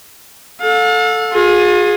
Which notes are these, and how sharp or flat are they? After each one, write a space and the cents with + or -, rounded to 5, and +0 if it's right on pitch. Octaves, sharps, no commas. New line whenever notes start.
A4 +0 F5 +45
F4 +40 G#4 +0